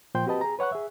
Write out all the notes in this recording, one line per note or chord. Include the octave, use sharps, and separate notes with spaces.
A#2 F3 C5 G5 C6 G6
C4 F#4 G4 B4 D#5 A5
G#4 A#5
B4 C#5 F#5 C#6 F#6
G#4 E5